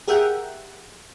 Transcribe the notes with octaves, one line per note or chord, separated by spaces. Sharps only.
G4 G#4 A#4 E5 F#5 G5